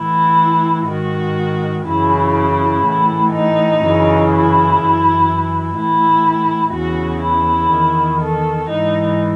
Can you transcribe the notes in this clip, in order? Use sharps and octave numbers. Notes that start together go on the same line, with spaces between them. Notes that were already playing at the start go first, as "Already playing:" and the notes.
Already playing: A2 E3 E4
G#2 D#3 F#4
F#2 C#3 E3 E4
E4
A2 E3
D#4
F#2 C#3 E3
E4
F#2 E3
A2 E3 E4
E2 C#3 E3 F#4
E4
E2 D#3
A4
G#2 E3 D#4